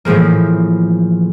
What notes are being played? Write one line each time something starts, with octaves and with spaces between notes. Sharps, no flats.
A2 E3 F3 G#3 A#3